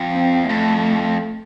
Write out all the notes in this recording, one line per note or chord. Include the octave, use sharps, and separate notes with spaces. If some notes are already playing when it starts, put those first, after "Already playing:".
Already playing: F2
C4
E2
F2 A3